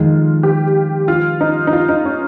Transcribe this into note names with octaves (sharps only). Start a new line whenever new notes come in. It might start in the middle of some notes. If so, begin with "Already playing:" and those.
Already playing: F2 D#3 G#3 F4
G4
F4
D#4
D#4
F4
D#4
C#4